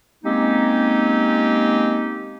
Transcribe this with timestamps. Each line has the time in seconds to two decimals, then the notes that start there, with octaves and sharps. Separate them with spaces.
0.24 G#3 A#3 C4 C#4 D#4 G4